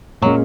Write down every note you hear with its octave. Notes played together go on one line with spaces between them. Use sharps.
A#2 F#3 G#3 C#4